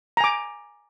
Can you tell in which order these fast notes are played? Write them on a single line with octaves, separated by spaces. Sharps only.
A#5 G#5 D6